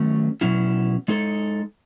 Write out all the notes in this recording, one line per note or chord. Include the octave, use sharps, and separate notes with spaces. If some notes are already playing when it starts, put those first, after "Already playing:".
Already playing: D#3 F#3 A3 C#4
B2 F#3 C#4 E4
G#3 D#4 A4